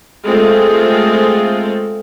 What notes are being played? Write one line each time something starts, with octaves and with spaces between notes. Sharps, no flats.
G#3 A3 C4 F4 A4